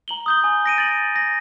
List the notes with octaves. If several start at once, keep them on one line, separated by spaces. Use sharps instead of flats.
A#5 F#7 G7
D#6 G6 G7
G#5 D#6
A#6 D7 D#7
A6 F#7
A#6